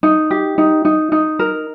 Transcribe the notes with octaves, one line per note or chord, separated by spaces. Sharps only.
D#4
G4
D#4
D#4
D#4
A#4